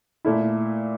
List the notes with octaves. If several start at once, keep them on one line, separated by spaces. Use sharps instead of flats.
A#2 A3 E4